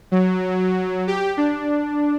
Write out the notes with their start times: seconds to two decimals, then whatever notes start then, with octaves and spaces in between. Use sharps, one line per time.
0.11 F#3
1.07 G4
1.37 D4